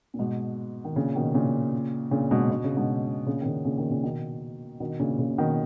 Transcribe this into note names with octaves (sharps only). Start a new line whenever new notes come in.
A#2
G#2 B2
D#3
A#2 C#3
B2 D#3
A#2 C#3
A#2 C#3
G#2 B2
B2
C#3
G#2 B2
A#2 C#3
D#3
A#2 C#3
A#2 C#3
B2 D#3
A#2 C#3
B2 D#3
B2 D#3
A#2 C#3
A#2 C#3
B2 D#3